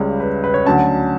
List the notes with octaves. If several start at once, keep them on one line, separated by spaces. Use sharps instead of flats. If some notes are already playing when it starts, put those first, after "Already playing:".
Already playing: C#2 C#3 G3
B4
B4
C#5
D2 D3 F#3 C#4 A5